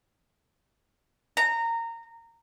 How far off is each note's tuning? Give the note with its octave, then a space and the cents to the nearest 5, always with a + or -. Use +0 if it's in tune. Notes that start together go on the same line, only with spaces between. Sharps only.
A#5 -20